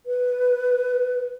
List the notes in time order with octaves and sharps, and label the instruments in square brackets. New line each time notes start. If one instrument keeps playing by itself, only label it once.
[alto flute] B4